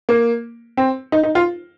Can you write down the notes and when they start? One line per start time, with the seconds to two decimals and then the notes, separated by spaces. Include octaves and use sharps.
0.09 A#3
0.77 C4
1.12 D#4
1.23 D#4
1.35 F4